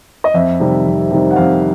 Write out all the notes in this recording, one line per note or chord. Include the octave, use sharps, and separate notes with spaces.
D#5
F2 E5
C3 D#3 G3
F2
C3 D#3 G3
F#5
F2 F5